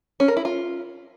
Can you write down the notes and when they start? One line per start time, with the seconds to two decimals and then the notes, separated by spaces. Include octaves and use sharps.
0.20 C#4
0.28 A#4
0.37 E4
0.45 F4